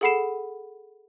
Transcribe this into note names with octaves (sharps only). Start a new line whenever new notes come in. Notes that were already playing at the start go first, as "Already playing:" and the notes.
G#4 A4 F#5 B5 C7 E7